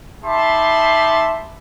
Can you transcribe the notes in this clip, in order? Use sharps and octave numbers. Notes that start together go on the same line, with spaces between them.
D#4 G4 E5 A5 B5 C6